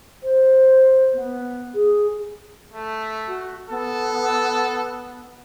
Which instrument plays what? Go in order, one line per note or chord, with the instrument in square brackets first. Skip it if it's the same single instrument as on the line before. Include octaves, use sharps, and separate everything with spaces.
[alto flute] C5
B3
G#4
[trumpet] A3
[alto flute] F#4
[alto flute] B3 [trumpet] A4